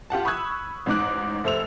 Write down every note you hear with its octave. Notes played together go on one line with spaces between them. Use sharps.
F4 G4 F#5 A5
B5 C#6 D#6 E6 F#6 G#6
A1 G#2 D#4 D6 F#6
F1 A3 C5 E6 F7